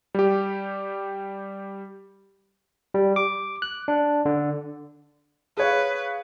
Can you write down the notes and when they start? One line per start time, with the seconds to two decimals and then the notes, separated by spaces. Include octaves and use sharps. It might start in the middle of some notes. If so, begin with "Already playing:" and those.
0.15 G3 G4
2.94 G3
3.16 D6
3.62 F#6
3.88 D4
4.25 D3
5.57 G#4 B4 C#5 F5